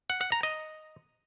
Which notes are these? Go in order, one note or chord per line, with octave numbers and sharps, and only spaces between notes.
F#5
F#5
A#5
D#5